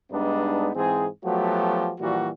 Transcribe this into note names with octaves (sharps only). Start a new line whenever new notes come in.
G2 G#3 B3 D4 D#4
G#2 E3 C4 G#4
F3 F#3 A3 B3 F#4 G4
A#2 E3 F3 G3 F#4